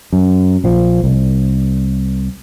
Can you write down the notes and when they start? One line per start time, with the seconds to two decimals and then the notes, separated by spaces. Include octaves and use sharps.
0.13 F#2
0.64 A#1 F3
1.04 C2